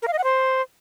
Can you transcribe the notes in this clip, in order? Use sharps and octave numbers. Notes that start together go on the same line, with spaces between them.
A#4
F5
D#5
F#5
C5